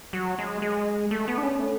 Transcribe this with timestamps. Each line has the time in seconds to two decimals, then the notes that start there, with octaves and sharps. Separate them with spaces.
0.13 F#3
0.39 G#3
0.62 G#3
1.11 A3
1.28 B3
1.38 D4
1.43 C#4
1.59 A3